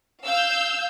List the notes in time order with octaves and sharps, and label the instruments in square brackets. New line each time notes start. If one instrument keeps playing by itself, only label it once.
[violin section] F5 E6 G6